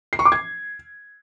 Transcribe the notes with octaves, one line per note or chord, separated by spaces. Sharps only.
C7
C#6
D6
G#6